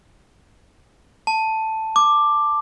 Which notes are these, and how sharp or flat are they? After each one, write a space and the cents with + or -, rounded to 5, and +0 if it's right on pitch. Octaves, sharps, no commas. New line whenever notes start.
A5 +5
D6 +10